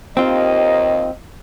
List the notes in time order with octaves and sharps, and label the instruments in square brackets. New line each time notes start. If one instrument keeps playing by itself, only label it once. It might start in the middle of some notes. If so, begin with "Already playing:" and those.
[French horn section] D#2 D#5 [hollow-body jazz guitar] C4 F4